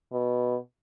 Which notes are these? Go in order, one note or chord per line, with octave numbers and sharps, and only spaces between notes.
B2